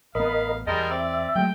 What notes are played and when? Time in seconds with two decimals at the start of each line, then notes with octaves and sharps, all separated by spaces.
0.15 A1 B3 A#4 D#5 F5 B5
0.67 E2 G3 G#3 A#4 D#5 A5
0.90 C4 D5 E5
1.35 F#3 G#3 A3 G5